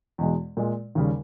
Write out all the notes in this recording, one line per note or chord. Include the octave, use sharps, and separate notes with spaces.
E2 B2 G#3
A#2 G#3
D#2 C#3 G3